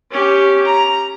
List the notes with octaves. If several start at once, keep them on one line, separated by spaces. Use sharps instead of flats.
C#4 G4
A#5